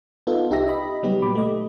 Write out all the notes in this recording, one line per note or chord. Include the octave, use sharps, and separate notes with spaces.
B3 D#4 F4 A4
C2 D#4 G4 E5 A#6
D#5 B5
C#3 F#3 G3 B3 D#4 G4
A#2 B5 D6
A3 D#5